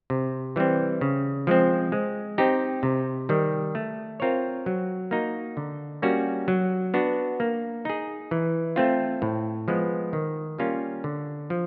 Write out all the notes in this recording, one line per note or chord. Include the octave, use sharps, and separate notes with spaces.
C3
E3 G3 C4
C#3
F3 G#3 C4
G#3
C4 D#4 G4
C3
D#3 G3
A3
C4 F4 A#4 C#5
F#3
A#3 D#4 F#4
D3
G3 A#3 C#4 F#4
F#3
B3 D4 F#4
A#3
D#4 G#4
E3
A3 C4 F4
A2
F3 G#3 B3
D#3
G3 A#3 C#4 F4
D3
F3